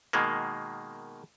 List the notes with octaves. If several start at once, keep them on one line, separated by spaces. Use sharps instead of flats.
B2 D#3 G#3 A#3